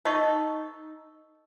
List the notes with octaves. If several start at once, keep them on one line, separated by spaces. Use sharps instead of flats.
D#4 A4 C5 D#5 C#6